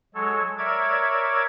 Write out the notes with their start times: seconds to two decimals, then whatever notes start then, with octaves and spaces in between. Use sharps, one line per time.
0.15 F#3 G#3 A4 C#5
0.58 A#4 C#5 D5 E5 D6 G#6